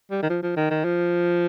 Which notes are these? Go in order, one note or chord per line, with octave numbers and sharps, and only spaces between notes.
G3
D#3
F3
F3
D#3
D#3
F3